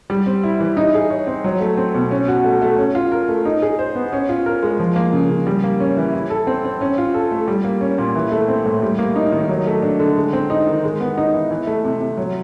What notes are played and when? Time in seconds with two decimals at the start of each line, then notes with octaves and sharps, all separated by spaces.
0.10 G3
0.26 C4
0.44 E4
0.60 E3
0.77 D#4
0.94 G#4
1.10 C#5
1.27 C4
1.44 F#3
1.61 A3
1.78 C4
1.95 B2
2.11 C#4
2.28 F#4
2.45 A3
2.62 A3
2.79 C#4
2.95 F4
3.12 A#4
3.29 A3
3.45 D#4
3.62 G#4
3.79 C5
3.95 B3
4.13 C#4
4.29 F4
4.46 A#4
4.63 G#3
4.80 F3
4.96 A#3
5.13 C#3
5.30 C#3
5.47 G3
5.64 A#3
5.80 C#4
5.97 E3
6.14 E4
6.30 A4
6.47 C4
6.64 C4
6.81 C#4
6.98 F4
7.14 A4
7.31 A3
7.48 G3
7.64 A#3
7.81 C#4
7.98 A#2
8.15 E3
8.32 A3
8.48 C4
8.66 A2
8.82 G3
8.99 A#3
9.16 D#4
9.32 D#3
9.49 F#3
9.67 A3
9.82 D4
10.00 D3
10.16 G#3
10.33 C4
10.50 D#4
10.67 D#3
10.84 G#3
11.00 B3
11.18 D#4
11.34 E3
11.51 E3
11.67 A3
11.84 C3
12.01 C3
12.17 F#3